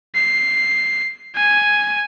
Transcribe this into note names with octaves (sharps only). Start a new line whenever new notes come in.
C7
G#5